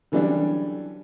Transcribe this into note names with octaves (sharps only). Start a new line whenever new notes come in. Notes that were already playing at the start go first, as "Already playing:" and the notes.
D3 E3 F#3 G3 C#4 D4